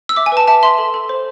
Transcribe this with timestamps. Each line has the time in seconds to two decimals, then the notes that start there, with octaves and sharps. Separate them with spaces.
0.09 E6
0.16 E5 D6
0.26 G#5
0.32 B4 A5
0.48 E5 A5
0.63 E5 C6
0.78 A4
0.94 A4
1.09 C5